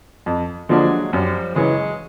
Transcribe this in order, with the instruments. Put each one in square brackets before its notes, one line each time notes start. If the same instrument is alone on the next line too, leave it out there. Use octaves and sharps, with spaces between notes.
[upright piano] F2
[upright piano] D3 F3 A#3 D4 [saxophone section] F#3 G#3
[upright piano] F#2 [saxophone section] F3 G3
[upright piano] C#3 E3 [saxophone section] F#3 G#3